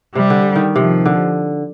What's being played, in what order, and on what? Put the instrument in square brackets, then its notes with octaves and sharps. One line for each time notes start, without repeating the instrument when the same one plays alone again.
[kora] C3 [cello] G3
[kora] D3
D#3
[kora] C3 [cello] F3
[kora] D3